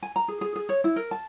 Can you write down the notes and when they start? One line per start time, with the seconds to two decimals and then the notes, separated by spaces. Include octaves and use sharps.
0.03 G#5
0.16 A#5
0.28 G#4
0.41 G#4
0.56 G#4
0.69 C#5
0.84 E4
0.96 A#4
1.11 A5